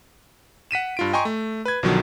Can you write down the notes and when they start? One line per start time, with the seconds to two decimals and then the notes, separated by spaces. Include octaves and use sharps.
0.71 F#5 B6 D#7 E7
0.97 G2 F4 D7
1.13 D#5 G5 G#5 A#5 C6 C#6
1.25 A3
1.65 B4 G#6
1.83 B1 B2 D3 D#3 F3 F#3